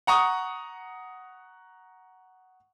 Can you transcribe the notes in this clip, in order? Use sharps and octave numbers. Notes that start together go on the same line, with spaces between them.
F#5 A#5 C#6 D#6